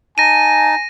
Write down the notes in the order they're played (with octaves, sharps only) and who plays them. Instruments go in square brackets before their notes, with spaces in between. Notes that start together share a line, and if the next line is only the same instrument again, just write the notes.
[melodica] D#4 A5 [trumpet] G#5 [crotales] A#6 D#7